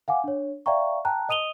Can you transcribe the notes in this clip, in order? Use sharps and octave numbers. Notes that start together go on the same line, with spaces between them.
F5 F#5 G#5 D6
D4 C#5
D5 E5 F5 G5 A#5 C#6
G5 A5 A#5 F#6
D#5 D#6 D#7 F7 G7